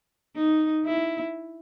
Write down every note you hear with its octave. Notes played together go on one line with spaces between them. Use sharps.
D#4
E4